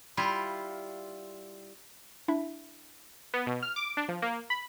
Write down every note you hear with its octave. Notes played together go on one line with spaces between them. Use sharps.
G3 E4 F4
D4 E4 E5
B3
B2
F6
D6
D4
F3
A#3
B5